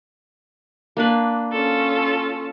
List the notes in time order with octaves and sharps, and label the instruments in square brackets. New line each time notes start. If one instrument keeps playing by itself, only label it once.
[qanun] A#3 D4 B4
[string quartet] C#4 F4 A4